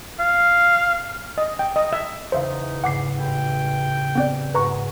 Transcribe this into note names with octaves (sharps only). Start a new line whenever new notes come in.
F5
D#5
G5
D#5
E5
E2 C#3 D#4 C5 E5 F5
G#2 C#3 F#5 D6 C7 E7
A1 G5 B5 C#7
B3 C4 D5
G#2 F#4 B4 A#5 C#6